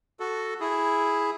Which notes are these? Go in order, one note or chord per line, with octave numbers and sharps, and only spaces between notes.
F#4 A4
E4 G#4